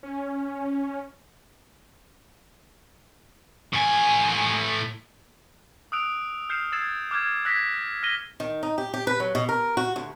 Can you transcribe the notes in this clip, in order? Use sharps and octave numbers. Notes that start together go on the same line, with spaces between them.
C#4
A2 G#5
D#6 E6 F#6 D7 F7
F6 G6 C7 C#7 E7
E6 G#6 A6 C7 E7
D6 F6 G6 G#6
E6 F#6 G#6 A#6 B6
F6 A#6 D#7 G7
D#3
D#4
G4
G4
B4
F#3
B2
A#4
F#4
D2